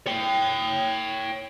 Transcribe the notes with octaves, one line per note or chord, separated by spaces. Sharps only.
C#5 G5